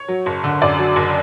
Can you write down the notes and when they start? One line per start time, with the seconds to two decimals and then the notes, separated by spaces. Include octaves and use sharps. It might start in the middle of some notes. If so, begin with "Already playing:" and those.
Already playing: C#5
0.08 F#3
0.26 F#1
0.44 D3
0.62 F#2 D5
0.79 F#3
0.96 F#1